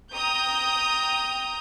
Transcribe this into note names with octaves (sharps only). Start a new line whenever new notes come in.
G5 A#5 D#6 G6